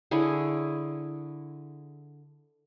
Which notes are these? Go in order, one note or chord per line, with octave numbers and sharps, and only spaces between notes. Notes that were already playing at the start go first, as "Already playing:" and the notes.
D3 E4 G#4 C#5